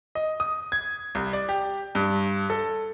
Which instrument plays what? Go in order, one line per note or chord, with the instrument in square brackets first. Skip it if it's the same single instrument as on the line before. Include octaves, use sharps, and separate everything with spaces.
[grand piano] D#5
D#6
G#6
C2
D5
G4
G2
A4